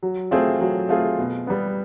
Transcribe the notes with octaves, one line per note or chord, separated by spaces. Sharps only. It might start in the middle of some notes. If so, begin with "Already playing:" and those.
F#3
A3 C4 F4 G#4
F#3
A3 C4 F4 G#4
B2
G3 B3